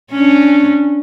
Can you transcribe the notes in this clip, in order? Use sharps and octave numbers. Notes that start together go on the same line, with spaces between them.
C#4 D4